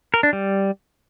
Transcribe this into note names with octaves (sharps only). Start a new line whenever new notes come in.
A#4
D4
G3